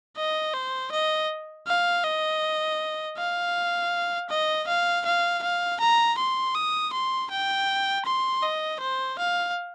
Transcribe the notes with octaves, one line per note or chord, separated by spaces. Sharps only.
D#5
C5
D#5
F5
D#5
F5
D#5
F5
F5
F5
A#5
C6
D#6
C6
G5
C6
D#5
C5
F5